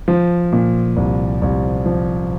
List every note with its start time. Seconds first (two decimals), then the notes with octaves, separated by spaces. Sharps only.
0.08 F3
0.53 A#2
0.96 C2
1.42 C2
1.86 F3